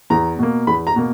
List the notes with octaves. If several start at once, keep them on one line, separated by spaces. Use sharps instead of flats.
E2 A#5
B2 A#3
E2 B5
A#5
B2 A#3